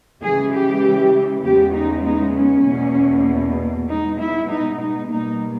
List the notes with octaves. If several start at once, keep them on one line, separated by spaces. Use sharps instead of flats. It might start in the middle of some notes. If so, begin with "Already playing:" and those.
C#3 E3 G#3 G#4
G4
E2 C#3 G#3 B3 G4
D#4
D#4
C#4
E2 B2 A#3
B2 G#3 B3 D#4
E4
D#4
D#4
B2 G3 A#3 D#4